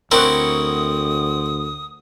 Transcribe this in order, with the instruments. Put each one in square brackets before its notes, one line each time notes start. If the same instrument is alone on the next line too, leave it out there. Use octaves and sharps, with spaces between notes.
[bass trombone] D2 [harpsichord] C4 E4 [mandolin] A#4 C#5 F#5 [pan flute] D#6